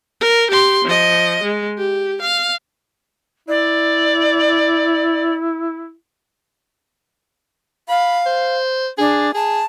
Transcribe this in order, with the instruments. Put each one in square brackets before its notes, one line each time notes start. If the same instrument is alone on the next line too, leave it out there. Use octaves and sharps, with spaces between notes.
[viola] A#4
G4 C6
F3 D#5
G#3
G4
F5
[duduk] E4 [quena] D5
[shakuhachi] F5 [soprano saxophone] B5
[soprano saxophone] C5
[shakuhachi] D4 [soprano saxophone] G#4
[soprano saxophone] G#4 [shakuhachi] A5